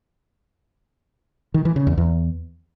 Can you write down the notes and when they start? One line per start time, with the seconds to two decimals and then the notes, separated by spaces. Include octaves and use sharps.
1.54 D#3
1.65 E3
1.76 C#3
1.87 E2
1.98 E2